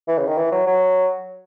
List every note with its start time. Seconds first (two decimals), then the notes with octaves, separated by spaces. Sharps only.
0.08 E3
0.18 C#3
0.27 D#3
0.37 E3
0.52 F#3
0.67 F#3